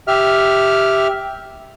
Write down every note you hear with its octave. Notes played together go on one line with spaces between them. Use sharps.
G4 E5 F6